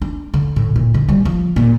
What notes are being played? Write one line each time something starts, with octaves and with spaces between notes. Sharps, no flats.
D4
D3
A2
A#2
D3
G3
F3
A#2